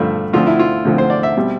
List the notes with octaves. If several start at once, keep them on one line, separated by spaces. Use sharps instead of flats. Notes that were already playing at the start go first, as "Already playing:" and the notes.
Already playing: G2 D3 F3 A3
D2 D3 F3 C4 F4
E4
F4
D2 D3 F3 C4
C5
D5
E5
B2 G3 C4